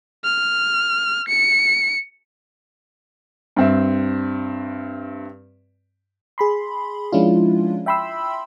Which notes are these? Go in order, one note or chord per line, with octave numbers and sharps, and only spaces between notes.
F6
C#7
G2 C4 E5
G#4 B5 C6
F3 G#3 C#4 D4 E4 F4
E5 G5 B5 C6 E6